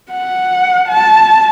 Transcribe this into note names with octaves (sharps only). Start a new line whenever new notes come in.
F#5
A5